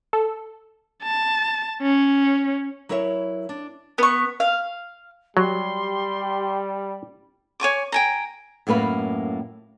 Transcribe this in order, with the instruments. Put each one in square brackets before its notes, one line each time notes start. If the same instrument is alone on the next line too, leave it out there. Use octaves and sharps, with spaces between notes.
[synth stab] A4
[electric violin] A5
C#4
[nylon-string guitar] F#3 E4 A#4 C#5 E5
D4
[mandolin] B3 C#6
F5
[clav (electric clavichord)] F#3 [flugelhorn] G3 [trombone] G4 [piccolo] C6
[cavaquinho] C#5 G#5 C#6 D6
G5 G#5 A#5
[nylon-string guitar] F#2 A2 A#3 B4 F5